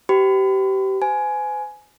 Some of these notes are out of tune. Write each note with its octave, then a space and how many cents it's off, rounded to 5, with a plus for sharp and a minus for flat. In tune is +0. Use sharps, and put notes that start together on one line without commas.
G4 -25 B4 +45 B5 +35
C5 -45 G#5 +15